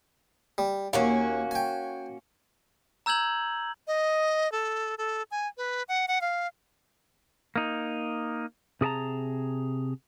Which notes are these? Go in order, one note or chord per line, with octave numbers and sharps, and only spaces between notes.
G3
D#2 A#3 C#4 F#4
G5 G#5
A#5 E6 G6 G#6 F#7
D#5
A4
A4
G#5
B4
F#5
F#5
F5
A#3 D#4
C3 G#4 A#4 A5 A#5